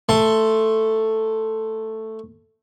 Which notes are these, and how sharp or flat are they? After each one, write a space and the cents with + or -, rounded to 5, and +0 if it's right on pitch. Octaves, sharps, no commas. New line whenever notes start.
A3 +5 C6 +0